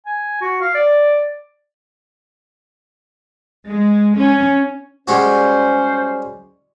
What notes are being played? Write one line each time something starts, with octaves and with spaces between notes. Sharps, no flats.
G#5
F#4
F5
D5
G#3
C#4
G3 G#3 C#4 F#4 C5